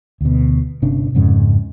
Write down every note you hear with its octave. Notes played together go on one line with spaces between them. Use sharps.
D2 B2
G1 C3 C#4 D4
F2 G#2 C#3 C#4